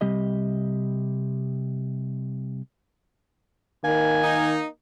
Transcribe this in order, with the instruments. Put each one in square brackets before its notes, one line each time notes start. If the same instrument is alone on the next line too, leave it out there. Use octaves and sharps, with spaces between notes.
[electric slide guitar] C3 G3 G4 D#5
[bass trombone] D#3 [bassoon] A#3 [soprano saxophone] G#5
[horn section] D#4